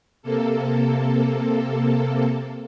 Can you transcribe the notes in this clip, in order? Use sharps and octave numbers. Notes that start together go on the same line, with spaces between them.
C3 A#3 A4